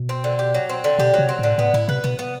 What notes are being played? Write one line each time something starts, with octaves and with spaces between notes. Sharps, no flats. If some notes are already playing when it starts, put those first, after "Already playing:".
Already playing: B2
C4
D3
G4
F#3
C4
D3
B2 G4
C3 F#3
C4
A2 D3
A2 B3
A2 E4
C3 B4
B2 B3
B3